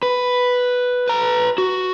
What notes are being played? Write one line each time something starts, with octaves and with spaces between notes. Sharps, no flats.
B4
B4 A#5
F#4